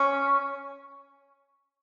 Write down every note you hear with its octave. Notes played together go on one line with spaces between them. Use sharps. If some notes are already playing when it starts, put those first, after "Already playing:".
Already playing: C#4